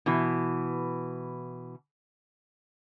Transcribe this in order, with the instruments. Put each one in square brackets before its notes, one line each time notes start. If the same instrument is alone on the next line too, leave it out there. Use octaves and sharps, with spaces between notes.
[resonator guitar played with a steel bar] B2 E3